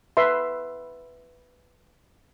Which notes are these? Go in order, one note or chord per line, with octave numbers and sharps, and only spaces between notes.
B4 E5 C6